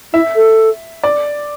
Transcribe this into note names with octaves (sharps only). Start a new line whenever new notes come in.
E4 E5
A4
D5